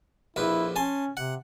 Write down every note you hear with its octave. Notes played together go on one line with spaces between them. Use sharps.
A#1 F2 E4 B4
C#4 G#5 A5 C6
C3 F#5